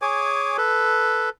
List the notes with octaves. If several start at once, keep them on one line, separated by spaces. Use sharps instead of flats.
G#4 C#5 G#5 D6
A4 B4